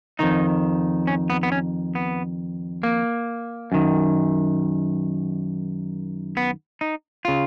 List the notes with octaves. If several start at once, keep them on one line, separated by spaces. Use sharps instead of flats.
F2 D#3 D#4
C#4
B3
B3
C#4
B3
A#3
F#2 D#3
B3
D#4
C#3 F4